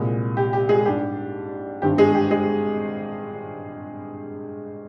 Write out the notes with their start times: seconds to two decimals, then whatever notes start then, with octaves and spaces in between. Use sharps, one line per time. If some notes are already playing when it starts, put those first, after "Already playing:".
Already playing: C2 A#2 G#3
0.37 G4
0.53 G4
0.69 G#3 G#4
0.85 G#2 G3 D4 G4
1.82 G#1 G2 D3 G4
1.98 G#3 G#4
2.14 G4
2.31 G#3 G#4